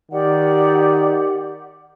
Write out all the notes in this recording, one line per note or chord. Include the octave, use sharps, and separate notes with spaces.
D#3 G4 D5 F#5